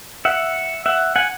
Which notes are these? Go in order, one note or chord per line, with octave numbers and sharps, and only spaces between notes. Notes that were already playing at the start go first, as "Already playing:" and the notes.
E5 F#5
E5 F#5
F#5 G#5